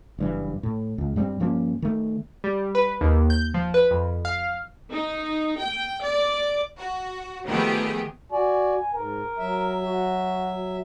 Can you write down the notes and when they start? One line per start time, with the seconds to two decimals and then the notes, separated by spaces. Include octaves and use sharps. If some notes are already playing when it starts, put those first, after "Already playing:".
0.19 F#1 G2 E3
0.63 A2
0.98 C#2
1.16 G2 G3 G#3 C4
1.40 G2 F3 A#3 C#4
1.82 D#3 A3
2.44 G3
2.75 B4
3.01 D#2
3.30 G6
3.54 F3
3.74 B4
3.91 F2
4.25 F5
4.91 D#4
5.59 G5
6.04 D5
6.77 F#4
7.46 D#3 F3 A3 B3 G4 G#4
8.32 F#4 D5 G#5
8.95 G#2 A#4
9.38 F#3 E5
9.84 F#4